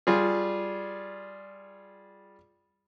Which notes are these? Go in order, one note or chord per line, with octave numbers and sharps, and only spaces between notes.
G3 F4 G#4